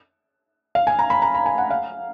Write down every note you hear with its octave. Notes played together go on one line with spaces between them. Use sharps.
F5
G#5
A#5
B5
A#5
B5
G#5
F#5
F5